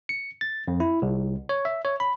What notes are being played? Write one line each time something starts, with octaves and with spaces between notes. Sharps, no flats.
C#7
A6
F2
E4
C2
C#5
E5
C#5
B5